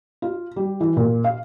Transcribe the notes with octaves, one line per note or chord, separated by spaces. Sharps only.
F4
G3
E3
A#2
F5